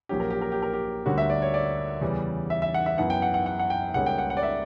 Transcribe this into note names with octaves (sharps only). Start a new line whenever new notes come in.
A#1 A#2 F#3 A#3 C#4 G4
A#4
G4
A#4
G4
A#4
G4
D2 D3 G3 A#3 C#4 F#4
E5
D5
C#5
D5
E2 C#3 G3 C#4
E5
E5
F#5
E5
F#2 E3 B3 F#5
G5
F#5
F#5
F#5
F#5
G5
C#2 C#3 G3 A#3 C#4 F#5
G5
F#5
F#5
D5
E5